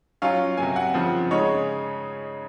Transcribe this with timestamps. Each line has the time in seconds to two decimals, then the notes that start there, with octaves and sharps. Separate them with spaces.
0.22 F#3 C#4 F4 F5
0.57 C3 F#3 A#3 G#5
0.76 F#5
0.94 C#3 F3 C4
1.31 C#3 G#3 D#4 C#5